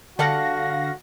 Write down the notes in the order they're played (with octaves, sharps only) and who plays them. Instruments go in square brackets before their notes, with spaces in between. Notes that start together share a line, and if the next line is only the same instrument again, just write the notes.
[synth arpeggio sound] D3 F5 A#6 [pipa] G3 A4 F#5 [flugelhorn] F#4